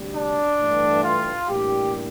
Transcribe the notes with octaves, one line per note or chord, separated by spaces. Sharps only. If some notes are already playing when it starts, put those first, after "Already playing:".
Already playing: D2 C3 G3
D4
G2 E3 A3
F4
A1 A2 G3 A#3 D4 G4